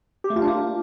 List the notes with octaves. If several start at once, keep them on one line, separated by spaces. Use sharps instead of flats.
G4
A3
F4
D4
A#3